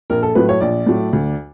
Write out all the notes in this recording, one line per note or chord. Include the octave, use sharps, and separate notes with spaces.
A#1 A#4
A4
A2 F#3 A3 B4
C#5
A#1 D5
A2 F#3 A3
D2